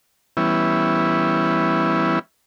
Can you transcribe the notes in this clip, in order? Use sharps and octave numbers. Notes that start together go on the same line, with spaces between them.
E3 G3 B3 C#4 E4